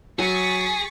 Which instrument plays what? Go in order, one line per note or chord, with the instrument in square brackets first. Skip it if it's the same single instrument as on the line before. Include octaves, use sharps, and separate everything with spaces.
[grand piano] F#3 [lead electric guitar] G#4 [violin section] C#6 A6 B6